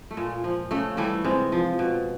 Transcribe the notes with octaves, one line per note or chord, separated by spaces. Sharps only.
A3
A#2 G#3
F3
C#3 A3
E3 G3 A3
C3 G#3
F3
B2